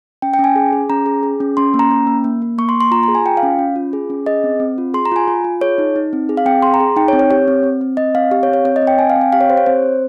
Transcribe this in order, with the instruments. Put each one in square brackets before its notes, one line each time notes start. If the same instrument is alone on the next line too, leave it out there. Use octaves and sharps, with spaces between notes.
[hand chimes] C#4 G5
G5
C#4
G#5
G#4
G#4
C#4 A#5
G#4
G#4
C#4
C#4 C6
A#3
A#5
C#4
A#3
A#3
A#3
A#3 C#6
C6
A#3
C6
F4 A#5
A#5
G#4
G#5
F4 G5
F5
C#4
C#4
F4
G#4
C#4
G#4 D#5
C4
C4
F4
G#4 C6
A#5
F4 G#5
F4
F4
G#4 C#5
D#4
D#4
C4
G#4
F5
C4 G5
G#4 C6
A#5
G#4
D#4 G5
C#5
C4
C#5
G4 C#5
C4
C4
C4
C4 D#5
C4 F5
G4 F5
C#5
C4
C#5
C4 C#5
D#5
C4
G5
C4 G#5
F5
C4
G5
G4 F5
C#5
G4 C5
C#5
C4 C5
C4